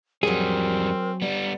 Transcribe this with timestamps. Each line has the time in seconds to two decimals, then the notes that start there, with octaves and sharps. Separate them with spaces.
0.23 F2 F#3 G3 C4 G#4 A#4
1.22 G3 B3 D5